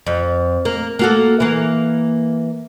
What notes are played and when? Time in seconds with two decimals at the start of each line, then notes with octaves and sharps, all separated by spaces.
0.07 F2
0.65 A#3
0.99 A#3 F#4 A4
1.40 E3 A#3